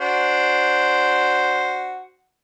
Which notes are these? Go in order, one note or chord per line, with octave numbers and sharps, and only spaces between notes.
D4 F#4 C5